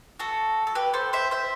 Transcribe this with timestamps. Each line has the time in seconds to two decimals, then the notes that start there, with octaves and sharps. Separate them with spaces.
0.19 F#4 A4
0.67 A4
0.75 G4 B4
0.94 A4 C5
1.13 C5 E5
1.31 C5 E5